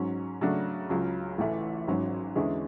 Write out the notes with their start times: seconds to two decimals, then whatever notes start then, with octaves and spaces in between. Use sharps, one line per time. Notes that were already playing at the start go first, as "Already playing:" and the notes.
Already playing: G#2 F#3 C#4
0.41 C#3 F#3 A3 D4 F#4
0.90 C#2 C#3 F#3
1.38 A1 A2 E3 A3
1.87 G#1 G#2 F#3 C#4
2.36 E2 D3 G#3 C#4 E4